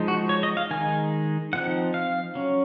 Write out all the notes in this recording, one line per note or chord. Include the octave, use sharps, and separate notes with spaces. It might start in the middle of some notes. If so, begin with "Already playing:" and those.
Already playing: F3 G#3 D#4
F#4
C#5
D#5
F5
D#3 G#3 D#4 G#5
F3 C4 D#4 F#5
F5
F#3 C#4